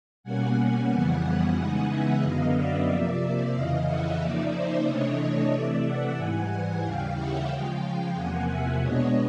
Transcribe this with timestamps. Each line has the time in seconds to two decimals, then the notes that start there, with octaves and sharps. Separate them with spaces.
0.23 B2 G3 A#3 C#4 F#5 G#5
0.57 F#5 G#5
0.89 F2 C#3 E3 G3 B3
1.55 C#3 E3 G#3 B3 D#4
1.88 E5 F#5
2.21 F#2 D3 F#3 B3 D#5 F5
2.54 D5 E5
2.87 C3 F3 A#3
3.53 F2 C#3 E3 D#5 F5
3.86 E5 F#5
4.19 C#3 F3 A#3 D#4 D5 E5
4.52 C5 D5
4.84 C3 E3 A3 D4 C#5 D#5
5.18 C#5 D#5
5.51 C3 E3 A3 D5 E5
5.84 E5 F#5
6.16 G#2 E3 G3 F#5 G#5
6.50 F#5 G#5
6.83 D#2 C#3 E3 G3 F5 G5
7.15 E5 F#5
7.49 C#3 F3 G#3 F5 G5
8.14 E2 C3 F3 A#3 F#5 G#5
8.48 E5 F#5
8.80 B2 G#3 B3 D4 C#5 D#5